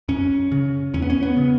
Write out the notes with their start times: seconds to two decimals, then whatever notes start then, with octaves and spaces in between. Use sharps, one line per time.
0.08 F#2 C#4
0.52 C#3
0.94 E2 C#4
1.02 B3
1.10 C#4
1.23 B3
1.37 C#3